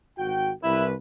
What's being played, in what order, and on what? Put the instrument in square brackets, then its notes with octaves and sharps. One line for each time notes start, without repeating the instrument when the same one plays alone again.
[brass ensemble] G#1 F#4 G5
[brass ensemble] C2 B4 [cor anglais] E4